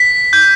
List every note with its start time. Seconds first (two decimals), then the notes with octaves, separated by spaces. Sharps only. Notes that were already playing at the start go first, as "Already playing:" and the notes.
Already playing: B6
0.33 G6